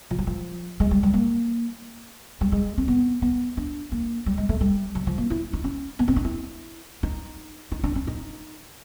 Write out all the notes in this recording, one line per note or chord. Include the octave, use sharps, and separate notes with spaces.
F3
F#3
F3
G#3
G3
G3
A#3
G3
G#3
C4
B3
B3
D4
A#3
G3
G#3
A3
G3
F#3
F3
A#3
E4
D#4
C#4
B3
C4
D4
E4
D#4
D#4
D4
C#4
D#4